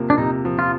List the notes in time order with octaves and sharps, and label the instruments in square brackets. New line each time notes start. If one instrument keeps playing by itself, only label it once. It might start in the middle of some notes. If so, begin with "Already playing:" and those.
Already playing: [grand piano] C3 F3 A#3
[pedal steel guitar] D4
[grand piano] C3 [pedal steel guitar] D#4
[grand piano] F3
[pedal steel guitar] F4